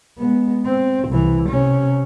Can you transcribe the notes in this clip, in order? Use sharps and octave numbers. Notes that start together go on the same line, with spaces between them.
G#3 B3
C4
C2 E3
C3 C#4